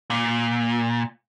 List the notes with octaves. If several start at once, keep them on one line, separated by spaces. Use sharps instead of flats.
A#2